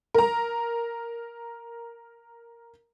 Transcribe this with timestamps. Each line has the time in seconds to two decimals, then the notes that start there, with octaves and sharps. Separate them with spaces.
0.14 A#4 A#5